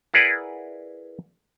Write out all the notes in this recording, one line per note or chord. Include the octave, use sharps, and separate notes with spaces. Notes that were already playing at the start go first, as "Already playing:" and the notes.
E4 G#4 A#4 B4 D5 F#5